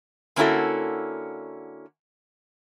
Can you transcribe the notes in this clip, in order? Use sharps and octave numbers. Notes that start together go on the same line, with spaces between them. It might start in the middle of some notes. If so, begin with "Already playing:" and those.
D3 A#3 C#4 E4 F#4 A4